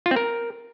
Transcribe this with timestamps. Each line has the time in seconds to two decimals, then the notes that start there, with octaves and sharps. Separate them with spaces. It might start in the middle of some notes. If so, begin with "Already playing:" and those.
0.06 F4
0.11 C4
0.16 A#4